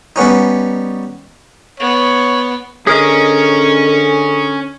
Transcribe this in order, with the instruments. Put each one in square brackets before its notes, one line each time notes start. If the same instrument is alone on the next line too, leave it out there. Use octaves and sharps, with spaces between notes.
[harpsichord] G3 B3 C#4 D#4
[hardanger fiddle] B3 [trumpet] C#5
[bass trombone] D3 [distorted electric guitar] C#4 [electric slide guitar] G#4 A#4 D#5